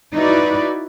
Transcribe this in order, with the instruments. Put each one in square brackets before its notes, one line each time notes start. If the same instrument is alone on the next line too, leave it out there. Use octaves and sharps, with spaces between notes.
[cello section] D#4 E4 F#4 B4 D5